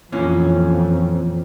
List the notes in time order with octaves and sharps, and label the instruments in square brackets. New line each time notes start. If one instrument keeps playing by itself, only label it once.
[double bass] F2 [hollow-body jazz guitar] A#2 E3 C#4